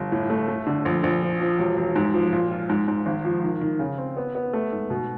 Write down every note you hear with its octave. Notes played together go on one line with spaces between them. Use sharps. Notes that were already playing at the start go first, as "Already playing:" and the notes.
Already playing: G1
A2
A3
A3
D3
A#1
A#1
F3
F3
E1
E1
G#2
F3
A#2
F4
G#2
G#2
G#1
F3
D#3
D#3
C#3
C4
B3
B3
A3
G#2
B2